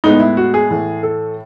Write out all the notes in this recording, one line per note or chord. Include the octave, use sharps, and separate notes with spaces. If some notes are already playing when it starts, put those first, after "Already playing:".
A2 G#3 B3 D#4
E4
F#4
G#4
A2 E3 A3
A4